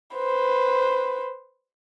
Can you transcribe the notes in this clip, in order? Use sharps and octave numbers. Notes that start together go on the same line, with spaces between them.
B4 C5